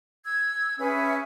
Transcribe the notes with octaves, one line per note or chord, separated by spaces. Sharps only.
E6 G#6
C#4 G#4 B4 E5